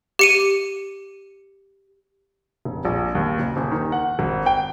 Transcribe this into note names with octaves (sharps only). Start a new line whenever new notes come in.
G4 C#7 D#7
F1
A#1
D#2
F#1
D#1
D#3
F#5
G#1
G5